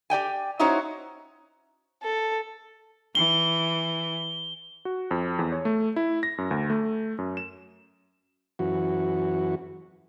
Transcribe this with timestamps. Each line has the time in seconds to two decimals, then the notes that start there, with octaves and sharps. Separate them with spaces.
0.10 G4 D5 G5 G#5
0.59 C#4 D#4 E4 F#4 C5 C#5
2.03 A4
3.15 E3 G7
4.85 F#4
5.11 F2
5.39 E2
5.52 C#5
5.65 A3
5.96 E4
6.23 A#6
6.38 F#2
6.51 D2
6.70 A3
7.18 F#2
7.37 E7
8.59 F#2 E3 F#4